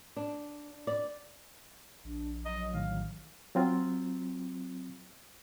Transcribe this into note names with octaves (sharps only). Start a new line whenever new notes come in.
D4
D5
A#1 D4
F#3 D#5
A2 D#3 E3 F5
F#3 C4 F4